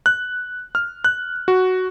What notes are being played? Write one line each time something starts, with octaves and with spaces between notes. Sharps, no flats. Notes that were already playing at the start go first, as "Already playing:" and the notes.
F#6
F6
F#6
F#4